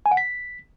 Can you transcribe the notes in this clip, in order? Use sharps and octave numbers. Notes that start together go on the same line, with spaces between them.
G#5
F#5
B6